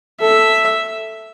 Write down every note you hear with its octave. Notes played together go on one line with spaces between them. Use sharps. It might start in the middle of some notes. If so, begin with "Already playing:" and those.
A4 E5